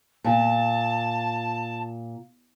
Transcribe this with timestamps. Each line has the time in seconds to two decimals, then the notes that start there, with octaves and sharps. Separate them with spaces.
0.24 A#2 A5